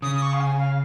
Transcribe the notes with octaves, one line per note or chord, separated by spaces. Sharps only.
C#3 D#6
D#6
C#6
F5
G#5
F5